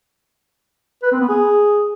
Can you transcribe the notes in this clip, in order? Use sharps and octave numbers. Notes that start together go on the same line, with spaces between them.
B4
C4
B3
G#4